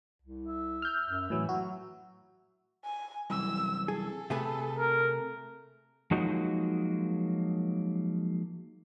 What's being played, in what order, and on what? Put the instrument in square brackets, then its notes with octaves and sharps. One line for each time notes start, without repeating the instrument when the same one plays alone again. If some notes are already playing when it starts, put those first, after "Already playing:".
[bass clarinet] C2
[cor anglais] E5
[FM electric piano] F6 G6
[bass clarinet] F#2
[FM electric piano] A2 F#3 [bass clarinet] E3
[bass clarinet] F#3 [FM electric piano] F#4
[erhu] G#5
[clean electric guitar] C2 F#2 E3 [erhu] E6
[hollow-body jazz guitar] G#4 [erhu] A4
[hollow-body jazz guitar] C3 G#4 B4 [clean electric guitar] A3
[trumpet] A#4
[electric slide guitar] F3 F#3 G#3 A#3 D#4 F#4